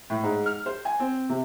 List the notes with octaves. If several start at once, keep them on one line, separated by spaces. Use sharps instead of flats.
A2
G#2
F6
C5
G#5
C4
C3